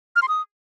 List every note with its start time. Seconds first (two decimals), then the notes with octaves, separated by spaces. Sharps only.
0.16 F6
0.22 C6
0.28 D#6